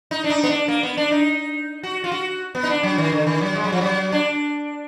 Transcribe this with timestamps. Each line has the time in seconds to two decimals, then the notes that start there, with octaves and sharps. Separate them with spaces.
0.11 D#4
0.24 D4
0.30 D#4
0.44 B3
0.49 D4
0.68 A#3
0.83 B3
0.97 D4
1.11 D#4
1.83 F#4
2.04 F4
2.12 F#4
2.55 B3
2.63 D#4
2.69 D4
2.83 F#3
2.98 D#3
3.12 D3
3.27 D#3
3.41 F#3
3.55 G#3
3.64 F#3
3.72 F3
3.81 F#3
4.12 D4